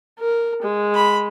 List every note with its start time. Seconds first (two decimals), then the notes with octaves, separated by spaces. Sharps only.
0.20 A#4
0.62 G#3
0.95 B5